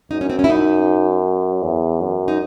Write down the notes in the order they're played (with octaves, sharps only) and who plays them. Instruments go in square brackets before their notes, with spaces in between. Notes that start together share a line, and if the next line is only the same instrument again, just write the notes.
[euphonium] F#2 [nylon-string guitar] D#4
[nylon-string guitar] C#4
C4
C#4
E4
D#4
[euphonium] E2
F#2
[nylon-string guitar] D#4